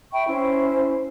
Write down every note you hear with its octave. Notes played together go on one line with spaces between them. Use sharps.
E5 G5 B5 C#6
C#4 E4 C5